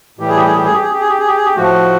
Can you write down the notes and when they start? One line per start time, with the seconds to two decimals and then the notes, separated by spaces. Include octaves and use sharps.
0.19 A2 E3 G3 G4
0.28 G#4
0.37 G4
0.45 G#4
0.55 G4
0.65 G#4
0.74 G4
0.81 G#4
0.92 G4
1.00 G#4
1.09 G4
1.19 G#4
1.27 G4
1.37 G#4
1.45 G4
1.56 A2 F3 A3 F#4